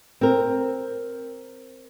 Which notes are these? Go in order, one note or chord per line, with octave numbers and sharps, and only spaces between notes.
C4 A#4